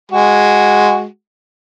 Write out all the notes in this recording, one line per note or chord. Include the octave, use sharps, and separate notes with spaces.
G#3 F#4